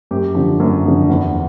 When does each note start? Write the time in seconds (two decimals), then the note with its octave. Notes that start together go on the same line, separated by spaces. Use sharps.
0.11 F#2 G4
0.35 D3 F3
0.60 F#2
0.85 D3 F3
1.09 E2